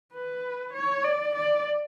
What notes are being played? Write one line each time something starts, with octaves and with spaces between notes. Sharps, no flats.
B4
C#5
D5
D5